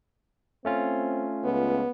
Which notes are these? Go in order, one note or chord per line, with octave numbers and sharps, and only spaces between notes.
A3 C4 C#4 F4
C#2 B3